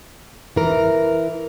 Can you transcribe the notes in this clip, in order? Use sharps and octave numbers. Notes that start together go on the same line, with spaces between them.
E3 A#4